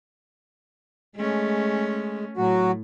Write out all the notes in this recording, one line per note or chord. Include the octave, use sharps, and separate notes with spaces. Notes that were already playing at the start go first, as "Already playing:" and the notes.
G#3 A3 C#4
A2 F#3 F#4